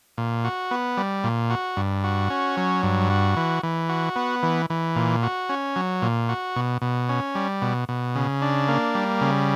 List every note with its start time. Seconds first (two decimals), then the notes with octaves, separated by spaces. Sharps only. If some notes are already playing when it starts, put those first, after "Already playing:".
0.18 A#2
0.44 F#4
0.71 B3
0.97 G3
1.24 A#2
1.50 F#4
1.77 G2
2.04 F#4
2.30 C#4
2.57 F#3
2.83 G2
3.10 F#4
3.36 E3
3.63 E3
3.89 F#4
4.16 B3
4.43 E3
4.70 E3
4.96 A#2
5.23 F#4
5.49 C#4
5.76 F#3
6.02 A#2
6.29 F#4
6.56 B2
6.82 B2
7.09 C#4
7.35 G3
7.62 B2
7.89 B2
8.15 C#3
8.42 D4
8.68 A#3
8.95 G3
9.21 C#3